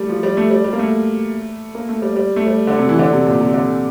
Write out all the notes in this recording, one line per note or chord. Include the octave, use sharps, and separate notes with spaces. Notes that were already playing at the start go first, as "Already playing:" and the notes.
Already playing: G3 A3
F3
G3
A3
G3
G3
A#3
A3
A#3
A3
G3
G3
A3
G3
D3
C3
E3
D3
C3
A#2
C3
D3